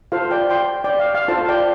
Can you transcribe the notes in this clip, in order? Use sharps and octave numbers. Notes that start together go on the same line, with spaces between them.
F4 A4 C5 F5
D5 G5
G5 C6
D5 G5
F5
F5
F4 A4 C5 F5 A5
D5 G5